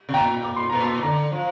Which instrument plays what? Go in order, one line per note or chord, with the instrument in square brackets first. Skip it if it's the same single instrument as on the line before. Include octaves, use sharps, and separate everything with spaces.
[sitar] C3
[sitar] A#2 [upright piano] G5 A#5
[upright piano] D6
C6
[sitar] A#2 [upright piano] A#5
[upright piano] A5 C6
[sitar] D3 [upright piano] A#5 D6
[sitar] F3